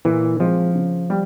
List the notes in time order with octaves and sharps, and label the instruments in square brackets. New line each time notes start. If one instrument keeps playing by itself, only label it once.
[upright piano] A#2 [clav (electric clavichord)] E3
[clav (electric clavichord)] F3 [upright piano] G#3 C4
[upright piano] C#3
G3